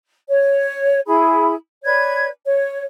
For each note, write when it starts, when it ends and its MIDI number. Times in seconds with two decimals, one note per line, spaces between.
0.29 1.00 73
1.07 1.54 64
1.07 1.54 68
1.07 1.54 83
1.85 2.28 71
1.85 2.28 73
1.85 2.28 74
1.85 2.28 92
2.45 2.85 73